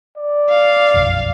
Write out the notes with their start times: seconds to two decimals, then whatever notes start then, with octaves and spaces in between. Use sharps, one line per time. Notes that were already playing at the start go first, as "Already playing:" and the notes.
0.17 D5
0.50 F5
0.94 F1 B1 F#2